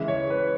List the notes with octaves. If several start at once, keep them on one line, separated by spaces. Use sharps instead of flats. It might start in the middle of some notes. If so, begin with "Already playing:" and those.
Already playing: C#3 E3 G#3 E5
C#5
B4